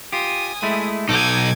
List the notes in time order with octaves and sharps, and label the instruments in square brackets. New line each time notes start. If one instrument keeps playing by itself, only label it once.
[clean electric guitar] F4 G4 [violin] G#5 D#6
[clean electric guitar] G#3 A3 E4
[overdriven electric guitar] B1 D#4 [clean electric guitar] A4 [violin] D6 G#6